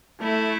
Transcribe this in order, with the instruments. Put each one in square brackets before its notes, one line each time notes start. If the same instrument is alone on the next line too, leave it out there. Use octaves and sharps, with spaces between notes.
[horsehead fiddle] A3 [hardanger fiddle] E4